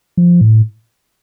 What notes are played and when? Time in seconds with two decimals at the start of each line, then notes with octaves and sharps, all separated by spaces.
0.17 F3
0.41 A2